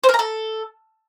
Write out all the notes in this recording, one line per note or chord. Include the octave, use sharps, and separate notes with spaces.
C5
A#4
A#5
A4